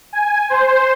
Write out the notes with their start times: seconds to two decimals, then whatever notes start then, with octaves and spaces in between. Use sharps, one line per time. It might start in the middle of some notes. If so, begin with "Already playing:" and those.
0.13 G#5
0.50 C5